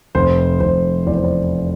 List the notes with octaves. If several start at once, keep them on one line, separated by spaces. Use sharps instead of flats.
F1 C5
F1 C5
E2 D5
C5
D5